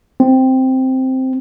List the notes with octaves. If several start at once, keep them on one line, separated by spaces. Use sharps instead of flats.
C4